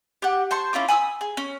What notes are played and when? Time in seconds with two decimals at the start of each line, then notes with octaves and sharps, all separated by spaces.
0.22 G4 F#5
0.51 C5 A5 C6 C#6
0.73 C#4 E4 F4 D6
0.88 G#5 B5 D#6 E6
1.21 G#4
1.37 C#4